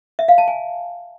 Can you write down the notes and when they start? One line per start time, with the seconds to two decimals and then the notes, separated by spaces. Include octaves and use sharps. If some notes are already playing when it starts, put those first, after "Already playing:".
0.19 E5
0.28 F5
0.38 A5
0.48 G#5